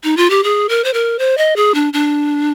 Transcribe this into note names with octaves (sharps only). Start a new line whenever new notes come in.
D#4
F4
G4
G#4
A#4
C5
A#4
C5
D#5
G#4
D4
D4